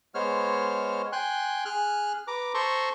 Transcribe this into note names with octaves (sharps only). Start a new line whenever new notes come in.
G#3 B3 C5 C#5 F6
G5 G#5 C6 F#6
G#4 F6 F#6
B4 A#5 D6
A4 C5 A#5 C6 C#6